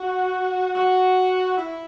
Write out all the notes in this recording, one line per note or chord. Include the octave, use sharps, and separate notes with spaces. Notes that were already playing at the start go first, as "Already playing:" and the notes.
Already playing: F#4
F#4
E4